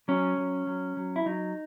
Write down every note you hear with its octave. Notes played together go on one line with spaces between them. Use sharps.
F#3 C#4
F#3
F#3
F#3
E4
F#3 D#4